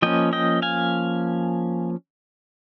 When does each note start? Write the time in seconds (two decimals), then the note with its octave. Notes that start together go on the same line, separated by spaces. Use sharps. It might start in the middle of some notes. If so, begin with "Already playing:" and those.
0.02 F3 A#3 C#4 D#5 G5
0.33 D#5 G5
0.62 F5 G#5